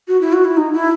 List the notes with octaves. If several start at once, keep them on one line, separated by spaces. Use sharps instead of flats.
F#4
E4
F#4
E4
D#4
E4